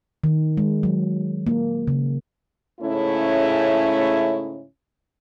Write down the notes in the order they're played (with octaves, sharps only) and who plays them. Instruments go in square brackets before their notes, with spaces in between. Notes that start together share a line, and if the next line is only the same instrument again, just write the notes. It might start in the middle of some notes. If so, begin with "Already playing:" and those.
[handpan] D#3
G#3
F#3
A#3
C#3
[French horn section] G#2 C#3 A3 C#4 E4